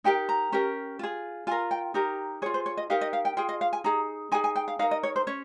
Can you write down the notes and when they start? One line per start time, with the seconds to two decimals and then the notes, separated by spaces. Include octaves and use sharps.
0.04 D#4 G4 A#4 G5
0.29 A#5
0.52 C#4 G4 A#4
0.99 F4 G#4
1.47 F4 G#5
1.51 A#4
1.71 G5
1.94 D#4 G4 A#4
2.42 G#4 C#5
2.46 F4
2.54 C5
2.66 C#5
2.77 D#5
2.90 D#4 G4 A#4 F5
3.01 D#5
3.13 F5
3.25 G5
3.37 F4 G#4 G5
3.49 D#5
3.61 F5
3.73 G#5
3.84 D#4 G#4 A#5
4.32 D#4 G#4 G#5
4.44 G#5
4.56 G5
4.68 F5
4.79 D#4 F5
4.82 A#4
4.91 D#5
5.03 C#5
5.16 C5
5.27 C#4 C#5